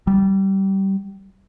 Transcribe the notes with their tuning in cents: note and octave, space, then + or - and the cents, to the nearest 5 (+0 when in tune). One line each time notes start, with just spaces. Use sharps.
G3 -20